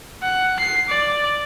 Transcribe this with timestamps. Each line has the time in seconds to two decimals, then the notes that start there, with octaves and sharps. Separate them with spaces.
0.23 F#5
0.60 C7
0.89 D5